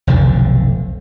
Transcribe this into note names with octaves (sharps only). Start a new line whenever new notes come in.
F1 B1 D3